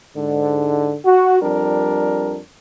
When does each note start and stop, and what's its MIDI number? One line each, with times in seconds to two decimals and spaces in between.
0.16 0.97 44
0.16 0.97 50
1.05 1.40 66
1.42 2.40 41
1.42 2.40 55
1.42 2.40 62
1.42 2.40 70